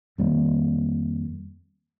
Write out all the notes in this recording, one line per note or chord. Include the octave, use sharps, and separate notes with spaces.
F2 D#3 G3 A#3